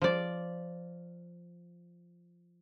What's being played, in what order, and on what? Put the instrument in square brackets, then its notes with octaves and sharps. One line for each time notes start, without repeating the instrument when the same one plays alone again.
[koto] F3 D5